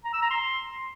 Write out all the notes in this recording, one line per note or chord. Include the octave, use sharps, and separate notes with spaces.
A#5
E6
A#5
C6